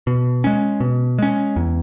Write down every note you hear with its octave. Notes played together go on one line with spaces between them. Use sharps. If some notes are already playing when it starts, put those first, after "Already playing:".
B2
G#3 C#4
B2
G#3 C#4
E2